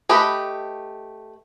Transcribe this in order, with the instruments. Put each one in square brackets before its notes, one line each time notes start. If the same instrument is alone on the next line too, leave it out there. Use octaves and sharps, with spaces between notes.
[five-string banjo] A3 G4 B4 D#5 B5